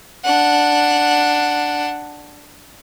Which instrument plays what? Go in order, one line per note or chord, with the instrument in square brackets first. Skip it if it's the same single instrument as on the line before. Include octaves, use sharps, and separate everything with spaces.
[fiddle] D4 F#5